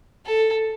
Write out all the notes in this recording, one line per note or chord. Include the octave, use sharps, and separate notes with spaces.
A4